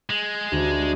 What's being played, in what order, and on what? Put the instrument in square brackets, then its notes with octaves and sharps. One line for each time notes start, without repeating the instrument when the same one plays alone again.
[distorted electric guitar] G#3
[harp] D2